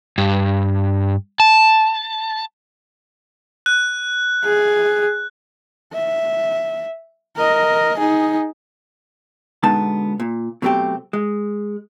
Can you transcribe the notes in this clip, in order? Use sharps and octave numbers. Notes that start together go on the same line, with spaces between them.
G2
A5
F#6
G#4
E5
A#4 D#5
D#4 G#4
B2 D3 G#3 B3 D#4 A5
A#2
B2 F#3 A3 C4 G4
G#3